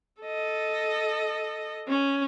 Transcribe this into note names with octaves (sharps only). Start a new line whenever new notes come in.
A4 D#5
C#4